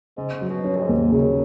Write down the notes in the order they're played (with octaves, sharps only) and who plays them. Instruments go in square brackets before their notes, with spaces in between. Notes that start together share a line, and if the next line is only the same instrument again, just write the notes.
[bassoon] G#2 [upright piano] C#3
[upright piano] F#3
[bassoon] B2
[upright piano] C#4
[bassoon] F#2
G#2
[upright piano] D#2
[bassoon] F#2 [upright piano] C#3